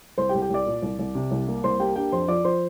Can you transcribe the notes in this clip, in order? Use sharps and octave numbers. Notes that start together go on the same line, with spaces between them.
C2 C5 C6
G4 G5
C2
G4 G5
C2 D5 D6
A#2
C2
C2
C3
C2
A#3
C2 C5 C6
A#3 G4 G5
D4 G4 G5
F2 C5 C6
F3 D5 D6
F3 C5 C6